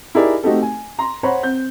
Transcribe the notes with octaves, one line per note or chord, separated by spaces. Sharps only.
D#4 E4 G4 G#4 A#4 D5
A3 C4 D#4 F#4 G4 A4
G#5
A#5 C6
C5 C#5 F#5 A#5 B5
C4 G6